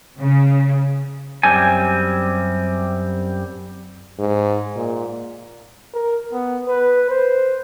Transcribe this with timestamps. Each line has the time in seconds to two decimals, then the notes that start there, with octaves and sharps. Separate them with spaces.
0.18 C#3
1.43 F#2 G3 C4 G#5
4.19 G#2
4.76 A#2
5.94 A#4
6.33 B3
6.67 B4
7.10 C5